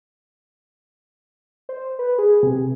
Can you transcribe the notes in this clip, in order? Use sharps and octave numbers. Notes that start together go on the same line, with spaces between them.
C5
B4
G#4
C3